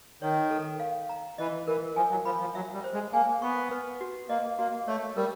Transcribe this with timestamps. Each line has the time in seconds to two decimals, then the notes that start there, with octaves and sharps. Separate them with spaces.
0.22 D#3 C#5
0.51 A4
0.80 F5
1.09 A#5
1.38 E3 D#5
1.67 E3 A#4
1.96 F3 G#5
2.11 F#3
2.25 F3 B5
2.40 F3
2.55 F#3 E5
2.74 G3
2.84 C5
2.93 G#3
3.13 A#3 G#5
3.42 B3 C#6
3.71 B4
4.01 F#4
4.29 A#3 D#5
4.59 A#3 F#4
4.88 A3 C#5
5.17 G3 A#4